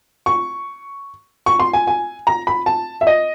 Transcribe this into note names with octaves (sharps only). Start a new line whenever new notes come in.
C#6
C#6
C6
G#5
G#5
A#5
B5
A5
E5
D#5